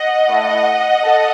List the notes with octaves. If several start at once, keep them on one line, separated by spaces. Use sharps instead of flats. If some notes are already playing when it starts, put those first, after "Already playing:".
Already playing: D#5 F#5
A3 E4 A4
A4